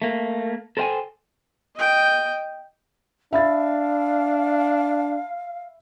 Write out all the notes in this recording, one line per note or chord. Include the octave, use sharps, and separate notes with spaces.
A3 A#3
A4 A#4 C5 F5 G5 G#5
D#5 G5
D4 E5 F5 B5 A6